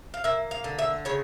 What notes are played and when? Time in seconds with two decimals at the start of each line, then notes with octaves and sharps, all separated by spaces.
0.14 F5
0.24 A#3 E5
0.51 F5
0.64 D3
0.79 E5
1.05 C#3 C#5